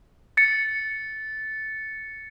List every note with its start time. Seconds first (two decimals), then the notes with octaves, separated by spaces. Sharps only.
0.37 A6 C#7